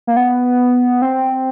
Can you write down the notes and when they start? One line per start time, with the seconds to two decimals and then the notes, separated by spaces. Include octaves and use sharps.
0.07 A#3
0.17 B3
1.02 C4